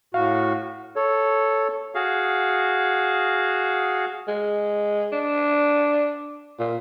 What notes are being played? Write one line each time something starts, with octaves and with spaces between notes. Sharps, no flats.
A2 F#4 F5
A4 C#5
F#4 G#4 F5
G#3
D4
A#2